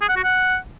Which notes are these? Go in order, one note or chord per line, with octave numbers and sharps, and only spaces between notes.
G#4
F#5
F#4
F#5